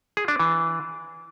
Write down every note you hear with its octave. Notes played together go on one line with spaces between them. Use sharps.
G#4
D4
E3